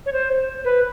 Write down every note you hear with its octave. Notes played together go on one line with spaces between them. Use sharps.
C#5
C5
B4